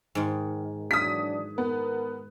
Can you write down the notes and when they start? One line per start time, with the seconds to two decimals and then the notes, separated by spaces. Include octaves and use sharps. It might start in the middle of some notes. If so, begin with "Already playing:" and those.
0.15 G#2 D#3
0.91 E3 F#3 D4 D#6 B6
1.58 B3 A#4 B4